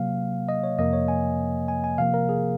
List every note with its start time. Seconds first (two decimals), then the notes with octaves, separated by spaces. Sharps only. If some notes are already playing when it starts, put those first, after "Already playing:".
Already playing: C3 F#3 A#3 F5
0.49 D#5
0.64 C#5
0.78 F2 C3 F3 A#3 D#5
0.93 C#5
1.08 G#5
1.68 G#5
1.84 G#5
1.98 C3 F3 A#3 F5
2.14 A#4
2.29 G#4